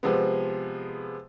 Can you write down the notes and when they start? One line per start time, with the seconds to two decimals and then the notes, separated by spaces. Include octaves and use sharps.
0.03 C3 F3 G#3 B3